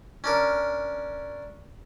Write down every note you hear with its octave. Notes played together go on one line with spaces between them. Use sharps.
C#4 D4 A#4